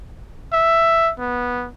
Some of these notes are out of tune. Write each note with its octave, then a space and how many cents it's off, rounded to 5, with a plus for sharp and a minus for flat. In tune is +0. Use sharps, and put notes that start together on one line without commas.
E5 +5
B3 -10